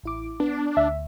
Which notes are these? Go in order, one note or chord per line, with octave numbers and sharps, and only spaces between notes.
A1 E4 D6
B3 D4
D2 E5